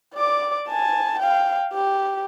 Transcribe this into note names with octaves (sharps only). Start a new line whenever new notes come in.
D5 D6
G#5 A5
F5 G5
G4